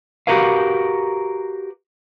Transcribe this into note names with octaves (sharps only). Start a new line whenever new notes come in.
F#4 G4 A#4 B4 F5